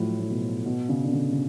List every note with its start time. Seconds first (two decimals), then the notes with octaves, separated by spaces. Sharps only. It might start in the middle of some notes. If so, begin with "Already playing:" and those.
Already playing: A2 F3 F#3
0.19 A2
0.30 B2
0.66 B2
0.89 C#3
1.04 D3
1.12 C#3
1.32 C#3